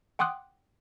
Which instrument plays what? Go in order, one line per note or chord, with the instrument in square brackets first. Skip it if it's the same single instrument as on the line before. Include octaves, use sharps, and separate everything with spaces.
[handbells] F#5 G5 C6 D6 D#6 F#6